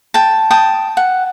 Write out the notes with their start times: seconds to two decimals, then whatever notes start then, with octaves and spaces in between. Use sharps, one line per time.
0.14 G5 A5
0.51 G5 A5 D#6
0.97 F#5